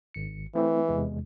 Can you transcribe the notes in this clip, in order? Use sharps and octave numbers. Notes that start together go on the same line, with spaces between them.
G#1 C#7
E3 A3 C4 E4
E2 C3 G#3